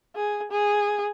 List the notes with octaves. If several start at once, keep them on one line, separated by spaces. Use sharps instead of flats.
G#4
G#4